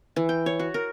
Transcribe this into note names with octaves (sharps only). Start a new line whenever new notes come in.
E3
G5
C#5
F#4
A#4